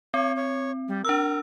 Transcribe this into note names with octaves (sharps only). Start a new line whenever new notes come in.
C4 C#5
C#5
G3
D4 A#4 E6